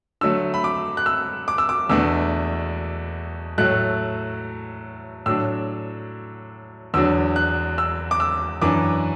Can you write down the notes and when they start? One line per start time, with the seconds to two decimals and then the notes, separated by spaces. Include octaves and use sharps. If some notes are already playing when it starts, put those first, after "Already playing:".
0.21 D3 F#3 A3 E6
0.54 B5
0.64 D6
0.97 F#6
1.06 E6
1.48 D6
1.58 E6
1.69 D6
1.89 E2 B2 A3 D4 E6
3.58 A2 F#3 A3 F#6
5.26 A2 F#3 D4 E6
6.94 E2 D3 F#3 D4 E6
7.36 F#6
7.78 E6
8.11 D6
8.20 E6
8.62 F#2 E3 D4 D6